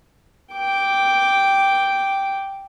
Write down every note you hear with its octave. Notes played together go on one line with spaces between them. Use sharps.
G5 D6